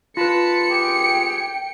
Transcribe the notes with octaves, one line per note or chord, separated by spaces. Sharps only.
F4 B4 A5 B5 C#7
G4 G#4 G5